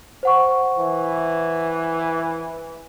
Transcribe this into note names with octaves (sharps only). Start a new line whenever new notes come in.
C5 F#5 C#6
E3